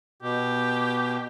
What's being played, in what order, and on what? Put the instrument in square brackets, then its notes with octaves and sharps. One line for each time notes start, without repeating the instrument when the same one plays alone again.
[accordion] B2 [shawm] G4